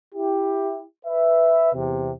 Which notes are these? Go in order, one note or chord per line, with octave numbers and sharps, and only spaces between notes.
E4 G4
B4 E5
E2 C3